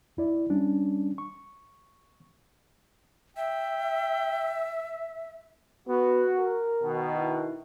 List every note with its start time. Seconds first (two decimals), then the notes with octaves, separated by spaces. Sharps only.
0.17 F2 E4 D5
0.50 G3 C#4 D4
1.18 C#6
3.37 E5 G5
5.88 B3 F#4
6.37 A#4
6.82 B2 D#3
7.17 E4